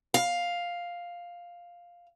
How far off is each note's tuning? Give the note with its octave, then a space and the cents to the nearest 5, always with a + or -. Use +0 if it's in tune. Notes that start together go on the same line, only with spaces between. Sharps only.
F5 +5